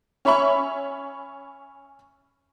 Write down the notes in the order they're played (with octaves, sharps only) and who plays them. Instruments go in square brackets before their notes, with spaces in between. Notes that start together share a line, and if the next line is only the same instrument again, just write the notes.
[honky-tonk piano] C#4 C#5 E5 B5 C#6